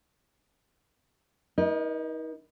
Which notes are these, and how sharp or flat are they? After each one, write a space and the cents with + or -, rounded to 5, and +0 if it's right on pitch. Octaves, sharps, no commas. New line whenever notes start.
D#4 +40 A#4 +45 D#5 -20